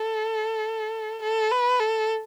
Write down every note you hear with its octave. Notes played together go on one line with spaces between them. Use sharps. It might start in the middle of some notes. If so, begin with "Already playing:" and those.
Already playing: A4
A4
B4
A4